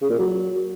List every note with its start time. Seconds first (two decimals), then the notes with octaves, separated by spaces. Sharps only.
0.01 C#3
0.10 A#2
0.19 F#3